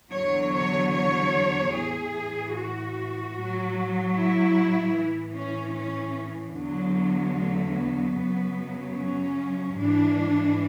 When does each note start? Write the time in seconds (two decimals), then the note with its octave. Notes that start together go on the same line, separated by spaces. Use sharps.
0.13 E2 D3 F#3 C#5
0.53 C#5
0.93 C#5
1.74 A2 E3 G#4
2.54 F#4
3.34 A2 F#3
4.15 E4
4.95 A2 E3
5.35 C#4
5.75 C#4
6.56 E2 D3 F#3
7.36 A3
7.77 B3
8.17 F#2 C#3 F#3
8.97 C#4
9.77 G#2 E3 D4